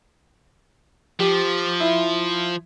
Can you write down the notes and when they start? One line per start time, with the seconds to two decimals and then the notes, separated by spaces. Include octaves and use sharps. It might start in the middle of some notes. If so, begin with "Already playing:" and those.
1.20 F3 G4
1.80 E4